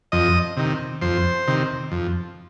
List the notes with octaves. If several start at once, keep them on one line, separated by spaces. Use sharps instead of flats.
F2 D#5
C3 D#3
F2 C5
C3 D#3
F2